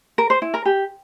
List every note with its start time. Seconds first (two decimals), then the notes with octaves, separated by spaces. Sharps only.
0.18 A#4
0.30 C5
0.42 E4
0.54 A#4
0.66 G4